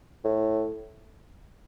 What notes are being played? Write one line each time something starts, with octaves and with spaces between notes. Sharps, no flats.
A2